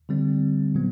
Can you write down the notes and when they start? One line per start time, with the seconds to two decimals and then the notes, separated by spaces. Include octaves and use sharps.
0.09 D3 G3 C4
0.75 A#2 F#3 B3